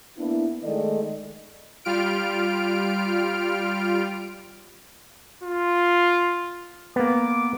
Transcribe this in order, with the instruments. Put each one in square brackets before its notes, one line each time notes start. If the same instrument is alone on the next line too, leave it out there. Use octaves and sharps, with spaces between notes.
[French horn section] A#3 B3 D4 E4
D#3 G#3 A3 A4 D5 D#5
[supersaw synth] G3 F4 F6 D7
[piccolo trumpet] F4
[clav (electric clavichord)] A#3 B3 [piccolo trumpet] D6